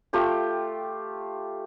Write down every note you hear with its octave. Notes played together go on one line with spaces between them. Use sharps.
A3 F4 G4 G5